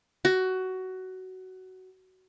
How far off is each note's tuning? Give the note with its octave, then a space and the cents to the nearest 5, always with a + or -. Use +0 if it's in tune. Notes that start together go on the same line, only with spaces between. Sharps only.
F#4 +15